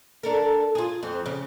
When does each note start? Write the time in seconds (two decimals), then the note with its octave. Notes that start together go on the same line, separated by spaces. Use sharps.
0.23 D4 A4 A#4
0.75 F4 G#4
1.03 F2 C4
1.26 C#3